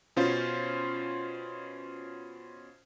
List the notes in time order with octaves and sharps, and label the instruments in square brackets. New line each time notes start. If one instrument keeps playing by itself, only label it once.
[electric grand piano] B2 C#4 F4 C5